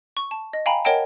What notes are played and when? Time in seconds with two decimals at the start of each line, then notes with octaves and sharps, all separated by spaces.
0.17 C#6
0.31 A5
0.53 D#5
0.66 F5 G5 G#5 A#5 B5
0.85 A#4 C#5 D#5 F#5 G5 A5